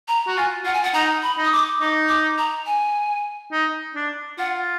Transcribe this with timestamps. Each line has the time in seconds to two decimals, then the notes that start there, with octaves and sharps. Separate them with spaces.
0.08 A#5
0.27 F#4
0.37 F4 G#5
0.65 F4 F#5
0.74 G#5
0.83 F#5
0.94 D#4 A#5
1.23 B5
1.38 D#4
1.44 D#6
1.52 D6
1.81 D#4 D6
2.09 D6
2.38 A#5
2.66 G#5
3.52 D#4
3.95 D4
4.38 F4 F#5